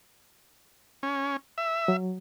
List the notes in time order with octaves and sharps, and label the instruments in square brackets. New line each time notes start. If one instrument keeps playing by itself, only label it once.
[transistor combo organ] C#4
E5
[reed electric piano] F#3